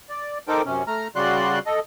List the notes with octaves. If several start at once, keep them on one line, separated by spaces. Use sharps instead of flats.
D5
D#4 A4 A#4 C5 G5 D6
F#2 C3 C#4
A3 A#5 F6
C#3 G3 F#4 D5 C6 F#6
A4 D#5